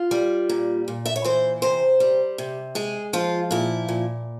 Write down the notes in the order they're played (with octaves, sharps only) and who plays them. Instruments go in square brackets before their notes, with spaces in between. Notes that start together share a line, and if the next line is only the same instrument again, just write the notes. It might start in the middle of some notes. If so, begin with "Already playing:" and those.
Already playing: [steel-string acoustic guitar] F4
G3
A#2
A#2
E5
C#5
E3 C5
C3 C5
G3
C3
G#3 G#4
F3 F4
A#2 E4
A#2